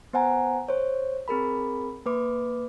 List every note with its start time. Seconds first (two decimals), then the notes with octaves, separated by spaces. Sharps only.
0.13 B3 C5 F#5 G#5 A#5
0.69 C5 C#5
1.28 C4 G#4 A#4 B5
2.06 A#3 B4 D6